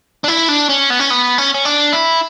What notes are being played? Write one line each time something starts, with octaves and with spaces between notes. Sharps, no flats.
D4
E4
D4
C#4
B3
C#4
B3
C#4
C#4
D4
E4